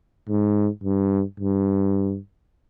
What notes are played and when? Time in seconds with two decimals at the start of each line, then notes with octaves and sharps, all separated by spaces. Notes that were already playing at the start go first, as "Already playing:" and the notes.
0.29 G#2
0.84 G2
1.40 G2